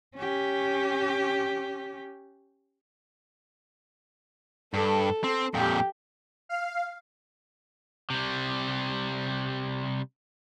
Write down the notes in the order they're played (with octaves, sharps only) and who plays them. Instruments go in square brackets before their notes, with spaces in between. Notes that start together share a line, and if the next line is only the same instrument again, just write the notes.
[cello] C#4 G4
[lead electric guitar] G2 [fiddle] A4
[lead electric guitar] C4
[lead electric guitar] F2 A#2 [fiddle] G4 G5
[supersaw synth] F5
[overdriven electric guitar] C3 G3